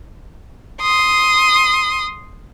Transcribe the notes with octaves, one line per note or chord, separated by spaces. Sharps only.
C6 D#6